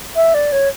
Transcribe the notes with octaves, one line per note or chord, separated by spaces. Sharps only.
E5
D5
C#5